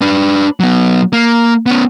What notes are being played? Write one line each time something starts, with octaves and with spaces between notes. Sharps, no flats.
D4 B4
F#3 B3
A#3
B3 C#4